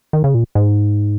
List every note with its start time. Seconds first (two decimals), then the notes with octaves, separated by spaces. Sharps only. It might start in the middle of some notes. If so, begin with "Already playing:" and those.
0.13 D#3
0.24 C#3
0.34 A#2
0.55 G#2